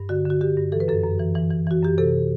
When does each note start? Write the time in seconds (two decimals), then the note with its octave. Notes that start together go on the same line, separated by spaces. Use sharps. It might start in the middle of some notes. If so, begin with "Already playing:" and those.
Already playing: G2
0.09 D3 F#4
0.25 D3 F#4
0.41 D3 G4
0.57 G2
0.72 E3 A4
0.80 B4
0.88 F#2 A4
1.04 F#2
1.20 E3
1.35 E3
1.51 E3
1.67 E3 F#4
1.82 F#2 G4
1.98 C3 A4